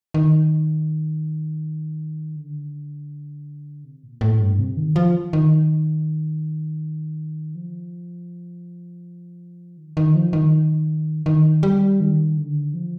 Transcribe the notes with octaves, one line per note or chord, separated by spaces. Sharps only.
D#3
D3
C3
A#2
A2
G2
C3
D#3
F3
D#3
F3
D#3
D#3
F3
D#3
D#3
G3
D#3
D3
F3